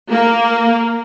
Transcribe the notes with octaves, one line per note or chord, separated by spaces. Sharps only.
A#3